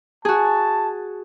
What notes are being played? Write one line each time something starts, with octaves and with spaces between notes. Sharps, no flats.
F#4 G#4 A5